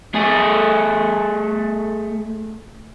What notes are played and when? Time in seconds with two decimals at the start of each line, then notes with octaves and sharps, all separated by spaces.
0.15 A3 G#4